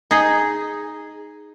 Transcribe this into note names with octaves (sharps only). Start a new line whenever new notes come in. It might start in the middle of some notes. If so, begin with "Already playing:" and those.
D#4 G#4